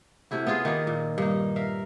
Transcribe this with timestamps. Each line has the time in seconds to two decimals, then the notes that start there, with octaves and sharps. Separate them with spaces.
0.31 C3 A3 E4 F#4
0.47 B3 C#4 F4 G#4
0.65 D#3 A#3 F4
0.87 A#2
1.18 G2 A#3 D#4
1.56 A#4 E5 F5